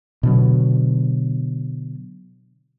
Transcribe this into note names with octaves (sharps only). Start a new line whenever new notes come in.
B2 D3 F#3